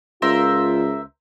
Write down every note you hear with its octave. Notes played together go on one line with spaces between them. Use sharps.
C#2 F4 A#4 C5 E5